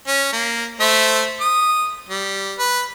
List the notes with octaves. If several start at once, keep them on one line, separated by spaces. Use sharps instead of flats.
C#4
A#3
A3 C5 E5
D#6
G3
B4